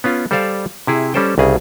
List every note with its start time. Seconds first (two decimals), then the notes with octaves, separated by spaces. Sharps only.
0.04 B3 C#4 F4
0.31 G3 A4 C5 D5 F5
0.87 C3 E4 G#4
1.14 G3 C#4 A4 C5 G5
1.38 C2 C#3 G#4